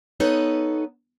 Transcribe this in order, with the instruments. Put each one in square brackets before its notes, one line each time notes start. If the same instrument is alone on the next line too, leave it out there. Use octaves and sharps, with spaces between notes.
[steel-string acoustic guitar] B3 D#4 A4 B4 C#5